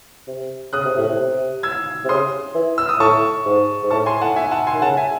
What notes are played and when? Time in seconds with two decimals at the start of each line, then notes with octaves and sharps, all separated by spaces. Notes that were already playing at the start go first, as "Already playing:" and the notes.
0.27 C3
0.73 C#3 D#6 F#6
0.85 C3
0.97 A2
1.09 C3
1.63 E6 G#6
2.04 C3
2.09 C#3 C6 D#6
2.54 E3
2.78 E6
2.89 D#6
3.00 A2 A5 C#6
3.45 G#2
3.83 G#2
3.91 A2 A5 C#6
4.06 G#5 C6
4.21 F#5 A5
4.36 E5 G#5
4.51 F#5 A5
4.67 G#5 C6
4.74 D#3
4.82 C#3 F#5 A5
4.97 E5 G#5